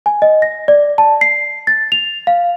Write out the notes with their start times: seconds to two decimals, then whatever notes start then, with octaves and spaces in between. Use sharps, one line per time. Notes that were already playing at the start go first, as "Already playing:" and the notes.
0.06 G#5
0.22 D#5
0.42 A#6
0.68 D5
0.98 A5
1.21 C7
1.67 A6
1.92 F7
2.27 F5